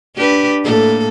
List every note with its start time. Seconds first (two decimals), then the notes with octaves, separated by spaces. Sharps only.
0.15 D4 G4 B4
0.64 A2 A#3 A4